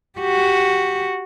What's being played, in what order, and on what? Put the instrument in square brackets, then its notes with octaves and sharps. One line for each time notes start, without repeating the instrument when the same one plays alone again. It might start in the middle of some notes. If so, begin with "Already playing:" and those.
[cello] F#4 G4